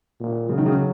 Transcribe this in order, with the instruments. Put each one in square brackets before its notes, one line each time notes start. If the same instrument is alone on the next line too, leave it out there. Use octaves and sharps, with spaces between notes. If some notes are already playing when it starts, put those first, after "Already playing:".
[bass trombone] A#2
[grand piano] C#3 [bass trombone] F#3
[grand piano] D#3
C#3